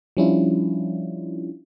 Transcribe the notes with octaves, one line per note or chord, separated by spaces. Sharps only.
F3 G3 C#4 D4 E4 F4